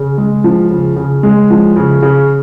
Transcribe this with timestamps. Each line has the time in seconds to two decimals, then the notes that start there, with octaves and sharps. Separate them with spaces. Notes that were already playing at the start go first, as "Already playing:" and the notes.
Already playing: C#3
0.18 G#3
0.44 F3
0.70 C#3
0.96 C#3
1.23 G#3
1.50 F3
1.76 C#3
2.02 C#3